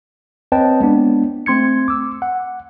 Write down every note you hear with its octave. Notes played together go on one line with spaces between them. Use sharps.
C4 B4 C#5 D#5 G5 A5
G#3 B3 D4
A3 C4 C6 G#6 C#7
D6 E6
F#5